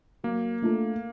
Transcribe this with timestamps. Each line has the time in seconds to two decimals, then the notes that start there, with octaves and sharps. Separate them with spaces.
0.23 F#3 A#3
0.62 A3 D4 F4 A4